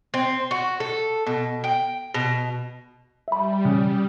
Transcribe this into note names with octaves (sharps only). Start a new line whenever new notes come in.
C4
F#4
A4
B2
G5
B2
G3 E5 B5
C#3